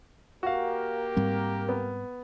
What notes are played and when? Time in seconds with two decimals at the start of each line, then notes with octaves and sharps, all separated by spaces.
0.43 A#3 F#4 G4 A#4 F5
1.16 G#2 G3 C4
1.69 B3